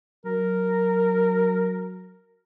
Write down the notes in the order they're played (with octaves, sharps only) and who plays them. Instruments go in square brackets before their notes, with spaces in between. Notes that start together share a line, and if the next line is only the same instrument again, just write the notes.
[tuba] F#3 [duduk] A#4